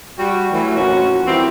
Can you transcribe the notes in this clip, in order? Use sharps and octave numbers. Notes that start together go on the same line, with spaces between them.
G3 F#4
E3 F#3 A3
F2 A#2 C#4 F#4
E3 G3 A#3 C4 E4 G4